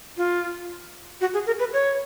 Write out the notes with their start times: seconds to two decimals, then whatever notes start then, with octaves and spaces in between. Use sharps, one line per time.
0.17 F4
1.21 F#4
1.34 G#4
1.46 A#4
1.59 B4
1.73 C#5